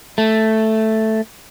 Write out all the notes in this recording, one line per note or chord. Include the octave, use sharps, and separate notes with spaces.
A3